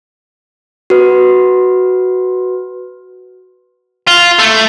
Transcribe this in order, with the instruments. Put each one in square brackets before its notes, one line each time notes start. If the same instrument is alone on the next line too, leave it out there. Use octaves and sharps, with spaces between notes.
[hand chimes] F#4 B4
[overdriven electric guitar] F4
A3